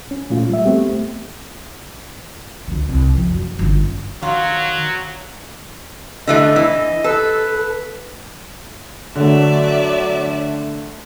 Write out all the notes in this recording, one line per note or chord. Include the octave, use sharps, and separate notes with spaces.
C#4
A#2 A3 F4
G3 E5
A3 B3 C4 G4
C#2 D3
C2
C#3 F3
F#2
G1 C#3
D#3 F#3 F4
D3 E3 A3 D#5
E3
A4 B4
D3 F#3 A3 D5 E5